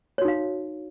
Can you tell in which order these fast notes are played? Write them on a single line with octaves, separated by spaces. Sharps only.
C#5 F#4 D#4 F5